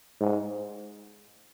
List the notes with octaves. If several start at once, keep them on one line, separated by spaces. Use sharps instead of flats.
G#2